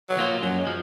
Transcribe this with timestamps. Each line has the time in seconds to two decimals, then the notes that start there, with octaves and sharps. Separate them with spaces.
0.09 F#3
0.17 F3 A#3 F4
0.42 F#2 F#3
0.59 G#3
0.67 F3